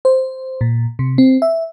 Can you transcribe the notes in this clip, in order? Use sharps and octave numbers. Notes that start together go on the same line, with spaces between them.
C5
A#2
C3
C4
E5